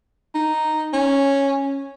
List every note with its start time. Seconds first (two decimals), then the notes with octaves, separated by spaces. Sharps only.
0.35 D#4
0.93 C#4